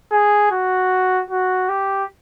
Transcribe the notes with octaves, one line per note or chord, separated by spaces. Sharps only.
G#4
F#4
F#4
G4